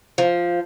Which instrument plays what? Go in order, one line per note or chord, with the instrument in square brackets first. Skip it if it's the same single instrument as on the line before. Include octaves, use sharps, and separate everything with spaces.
[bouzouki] F3